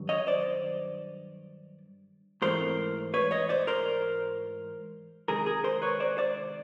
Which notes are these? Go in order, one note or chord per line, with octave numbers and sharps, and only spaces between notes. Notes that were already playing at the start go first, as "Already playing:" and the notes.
Already playing: G2 D#3 F#3
C#5 D#5
C5 D5
G#2 E3 A3 C4 A#4 C5
B4 C#5
C#5 D#5
C5 D5
A#4 C5
C3 D#3 G#3 G#4 A#4
G#4 A#4
A#4 C5
B4 C#5
C5 D5
C5 D5